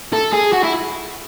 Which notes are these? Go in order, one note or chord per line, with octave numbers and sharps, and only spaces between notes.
A4
G#4
F#4
E4